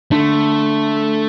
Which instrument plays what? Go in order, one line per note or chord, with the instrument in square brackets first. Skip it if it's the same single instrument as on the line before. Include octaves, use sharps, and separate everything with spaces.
[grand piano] D3 [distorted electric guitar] A3